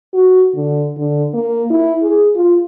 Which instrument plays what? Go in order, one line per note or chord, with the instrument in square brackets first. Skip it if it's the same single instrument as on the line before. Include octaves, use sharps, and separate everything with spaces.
[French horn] F#4
D3
D3
A#3
E4
G#4
F4